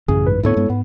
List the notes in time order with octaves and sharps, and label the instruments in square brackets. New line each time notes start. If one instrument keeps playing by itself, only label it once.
[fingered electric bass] A1 F#2 [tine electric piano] C#3 G#4
[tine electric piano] G#2 B4
[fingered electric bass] D2 G#2 B3 [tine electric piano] E4 A4 C#5
[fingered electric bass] G2 G#3 B3
[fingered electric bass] G#2 [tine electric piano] B3